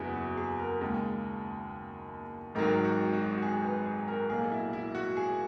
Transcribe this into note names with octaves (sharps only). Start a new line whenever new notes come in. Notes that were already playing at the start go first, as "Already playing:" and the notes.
Already playing: F#1 E2 C#3 F#3 B3 E4 F#4 G#4
F#4
G#4
A#4
D#2 C#3 G#3
G#1 G#2 D#3 F#3 A#4
F#4
F#4
F#4
G#4
B4
G#4
A#4
B1 A#2 A#3 G#4
E4
E4
F#4
G#4